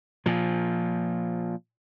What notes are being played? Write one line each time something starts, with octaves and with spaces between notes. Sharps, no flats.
A#2 F3